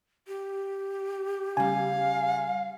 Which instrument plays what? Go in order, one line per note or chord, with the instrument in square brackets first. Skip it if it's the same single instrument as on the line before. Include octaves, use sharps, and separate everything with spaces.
[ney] G4
[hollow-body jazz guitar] C#3 G3 [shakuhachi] F5 [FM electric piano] G#5